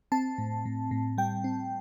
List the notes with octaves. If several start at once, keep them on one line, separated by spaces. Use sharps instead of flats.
C4 A5
A2
A2
A2
G3 G5
C4